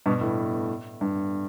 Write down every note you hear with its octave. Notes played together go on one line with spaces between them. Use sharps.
G2 B2
A2
G2